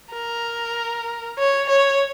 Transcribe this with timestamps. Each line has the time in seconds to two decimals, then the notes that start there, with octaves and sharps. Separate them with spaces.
0.12 A#4
1.39 C#5
1.69 C#5